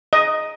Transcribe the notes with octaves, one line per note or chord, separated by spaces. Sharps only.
D#5